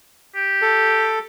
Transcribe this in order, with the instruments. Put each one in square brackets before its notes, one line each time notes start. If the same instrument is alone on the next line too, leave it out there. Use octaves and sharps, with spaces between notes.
[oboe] G4
[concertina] A4